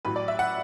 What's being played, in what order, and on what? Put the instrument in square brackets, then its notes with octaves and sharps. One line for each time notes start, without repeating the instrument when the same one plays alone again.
[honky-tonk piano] A1 A2 F#3 B4
D5
E5
F#5